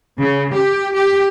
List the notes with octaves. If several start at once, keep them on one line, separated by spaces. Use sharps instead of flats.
C#3
G4
G4